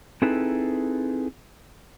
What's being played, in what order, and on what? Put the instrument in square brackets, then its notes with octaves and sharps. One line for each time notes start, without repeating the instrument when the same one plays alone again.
[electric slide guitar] C4 D#4 E4 G#4 A4 B4